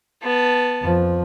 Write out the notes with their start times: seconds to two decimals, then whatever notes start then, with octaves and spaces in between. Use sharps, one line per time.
0.23 B3 A5
0.82 F2 F3